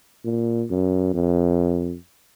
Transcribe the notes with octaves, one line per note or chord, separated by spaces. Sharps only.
A#2
F#2
F2